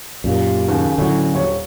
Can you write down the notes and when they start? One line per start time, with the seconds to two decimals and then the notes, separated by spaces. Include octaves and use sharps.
0.24 F#2 A#2 G4 F5
0.69 D#2 C#3 C#4 G#5
0.98 A2 D3 F#3
1.34 D#1 C#5